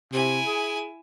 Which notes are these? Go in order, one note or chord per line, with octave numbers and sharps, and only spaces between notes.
C3 E4 G#5
G#4